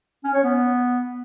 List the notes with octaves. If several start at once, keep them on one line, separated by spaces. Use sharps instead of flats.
C#4
C#5
B3